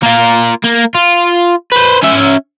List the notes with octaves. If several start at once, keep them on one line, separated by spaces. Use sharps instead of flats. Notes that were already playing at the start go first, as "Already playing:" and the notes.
A#3 F4
A#3
F4
B4 C5
C#4 E5